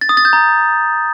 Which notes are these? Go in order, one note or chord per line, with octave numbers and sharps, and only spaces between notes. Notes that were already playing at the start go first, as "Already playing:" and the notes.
A6
D#6
A6
G6
A#5